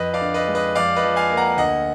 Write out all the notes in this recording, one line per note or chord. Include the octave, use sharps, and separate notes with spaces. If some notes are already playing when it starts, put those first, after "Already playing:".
Already playing: F2 B4 D#5
D5 F5
D3
B4 D#5
G#3
B4 D#5
F2 D5 F5
B4 D#5
F3
F5 G#5
A#3
F#5 A#5
D2 D#5 F#5